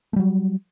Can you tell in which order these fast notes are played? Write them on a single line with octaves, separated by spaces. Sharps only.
A3 G3 F#3